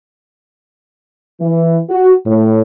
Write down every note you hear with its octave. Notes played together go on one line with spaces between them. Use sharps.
E3
F#4
A2